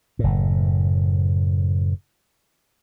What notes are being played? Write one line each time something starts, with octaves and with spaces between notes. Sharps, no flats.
F#1 A2